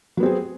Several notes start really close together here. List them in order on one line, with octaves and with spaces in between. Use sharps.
F#3 B3 C4 G#4